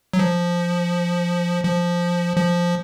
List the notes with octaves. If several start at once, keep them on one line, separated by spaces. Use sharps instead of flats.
F#3
F3
F3
F3